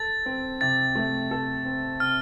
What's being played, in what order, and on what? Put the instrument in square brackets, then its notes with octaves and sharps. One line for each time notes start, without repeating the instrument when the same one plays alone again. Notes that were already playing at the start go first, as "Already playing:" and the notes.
Already playing: [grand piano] A4 [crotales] A6
[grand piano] C4
[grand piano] C3 [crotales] A6
[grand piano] A3
A4
C4
[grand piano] C3 [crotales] F6